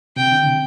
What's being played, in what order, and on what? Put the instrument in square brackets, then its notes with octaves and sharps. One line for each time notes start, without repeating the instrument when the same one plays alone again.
[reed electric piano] C3 [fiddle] G5
[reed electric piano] D3
C3